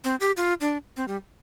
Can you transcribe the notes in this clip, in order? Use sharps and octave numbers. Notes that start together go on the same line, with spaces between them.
C4
G4
F4
D4
C4
G3